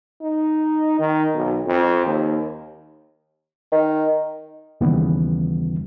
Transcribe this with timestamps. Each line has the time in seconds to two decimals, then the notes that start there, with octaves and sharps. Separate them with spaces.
0.22 D#4
0.99 D#3
1.35 B1
1.67 F2
2.06 D#2
3.72 D#3
4.81 D#2 C#3 E3 G3 B3